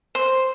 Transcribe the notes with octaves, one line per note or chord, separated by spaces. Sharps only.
C5